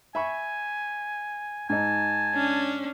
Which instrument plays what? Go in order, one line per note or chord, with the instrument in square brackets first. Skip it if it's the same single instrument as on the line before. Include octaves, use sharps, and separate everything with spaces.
[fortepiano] E5 B5 C#6 [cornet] G#5
[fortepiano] G#2 D#4 [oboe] G#5 [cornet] A5
[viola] C#4 D4